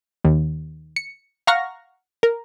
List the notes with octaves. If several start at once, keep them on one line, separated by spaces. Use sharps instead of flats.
D#2
C#7
F5 F#5 A#5 C#6 F6 A#6
A#4